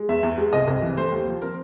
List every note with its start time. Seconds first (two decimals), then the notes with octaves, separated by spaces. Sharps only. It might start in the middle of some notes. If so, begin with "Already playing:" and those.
Already playing: G#3
0.09 E2 E5
0.23 E2
0.38 G#3
0.53 C2 D#5
0.68 C2
0.82 E3
0.97 A3 C5
1.12 D#2
1.27 F3
1.42 C4 A#4